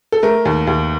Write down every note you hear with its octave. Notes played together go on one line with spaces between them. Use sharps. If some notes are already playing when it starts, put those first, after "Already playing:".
A4
A3 A#4
D#2
D#2